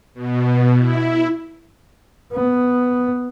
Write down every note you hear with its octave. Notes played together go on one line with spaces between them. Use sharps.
B2
E4
B3